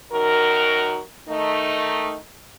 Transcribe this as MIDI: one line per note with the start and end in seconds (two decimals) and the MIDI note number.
0.12 1.00 42
0.12 1.00 51
0.12 1.00 66
0.12 1.00 70
1.28 2.15 51
1.28 2.15 57
1.28 2.15 63